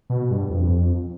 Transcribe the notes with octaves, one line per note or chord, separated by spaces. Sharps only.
B2
G2
F2